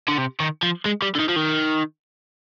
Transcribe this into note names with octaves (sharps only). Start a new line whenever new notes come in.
D3
C3
D#3
F3
G#3
G3
D3
D#3
F3
D#3